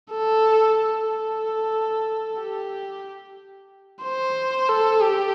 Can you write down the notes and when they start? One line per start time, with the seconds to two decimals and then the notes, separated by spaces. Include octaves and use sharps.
0.11 A4
0.77 A4
1.09 A4
2.40 G4
4.04 C5
4.69 A4
5.02 G4